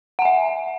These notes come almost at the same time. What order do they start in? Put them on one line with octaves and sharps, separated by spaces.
F#5 G#5 E5